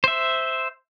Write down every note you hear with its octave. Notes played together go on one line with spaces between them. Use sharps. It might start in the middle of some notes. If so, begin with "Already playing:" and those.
C5 E5